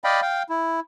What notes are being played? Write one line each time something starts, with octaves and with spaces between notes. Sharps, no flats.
D5 D#5 F5 G5 B5
F5 G5
E4